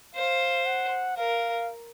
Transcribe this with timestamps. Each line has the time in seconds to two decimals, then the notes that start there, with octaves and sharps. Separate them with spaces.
0.15 C5 F5
0.66 F#5
1.17 A#4 F5